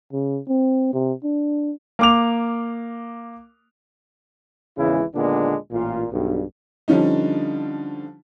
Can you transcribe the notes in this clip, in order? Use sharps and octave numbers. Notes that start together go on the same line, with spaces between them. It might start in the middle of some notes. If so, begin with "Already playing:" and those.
C#3
C4
C3
D4
A#3 D6 F7
G#1 E2 C#3 E3 G#3 E4
D#2 A#2 D3 G#3 B3 D4
A1 A#2 F4
B1 G2
D3 F3 G3 C#4 D#4